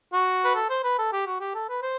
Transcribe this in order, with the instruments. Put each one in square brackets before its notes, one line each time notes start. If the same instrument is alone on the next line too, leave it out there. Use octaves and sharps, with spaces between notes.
[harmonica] F#4
B4
A4
C5
B4
A4
G4
F#4
G4
A4
B4
C5